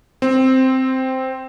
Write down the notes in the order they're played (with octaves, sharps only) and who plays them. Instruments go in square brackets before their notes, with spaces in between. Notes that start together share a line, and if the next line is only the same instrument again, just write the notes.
[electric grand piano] C4